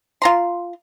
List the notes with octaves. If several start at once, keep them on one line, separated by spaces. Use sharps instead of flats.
F4 A#5 C6